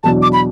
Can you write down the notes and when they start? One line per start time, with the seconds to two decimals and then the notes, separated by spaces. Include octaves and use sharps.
0.04 E2 B2 F#3 D4 A5
0.22 D6
0.33 B5